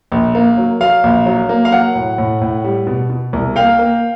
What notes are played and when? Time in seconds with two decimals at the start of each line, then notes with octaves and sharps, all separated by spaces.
0.12 A#1
0.35 A#3
0.57 F#3
0.80 F#3 F5
1.03 A#1
1.26 F#3
1.49 A#3
1.65 F5
1.72 F#3 F#5
1.95 A2
2.18 A2
2.41 A2
2.64 G3
2.87 B2
3.10 B2
3.33 C2
3.56 A#3 F5 G5
3.79 A#3